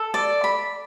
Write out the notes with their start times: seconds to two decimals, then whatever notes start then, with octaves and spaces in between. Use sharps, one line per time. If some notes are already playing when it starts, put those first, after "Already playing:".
Already playing: A4
0.14 D5
0.44 B5